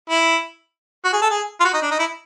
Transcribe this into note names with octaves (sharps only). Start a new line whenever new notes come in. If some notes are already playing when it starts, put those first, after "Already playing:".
E4
F#4
G#4
A4
G#4
F4
F#4
D#4
D4
D#4
E4